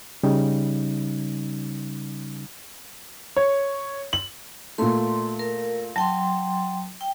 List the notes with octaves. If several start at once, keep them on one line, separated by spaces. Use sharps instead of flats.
C#3 G3 C#4 D#4
C#5
F#7
A#2 A3 C6
A#4
F#3 G5 A5 C6
G5